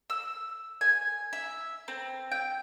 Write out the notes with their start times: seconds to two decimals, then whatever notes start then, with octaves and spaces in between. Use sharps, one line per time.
0.10 E6
0.81 G#5
1.33 E5
1.88 C4
2.32 G5